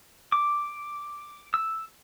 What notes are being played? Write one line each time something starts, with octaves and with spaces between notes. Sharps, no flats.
D6
E6